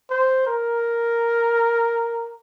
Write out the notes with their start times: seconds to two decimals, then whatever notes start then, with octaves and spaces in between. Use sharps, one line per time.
0.10 C5
0.47 A#4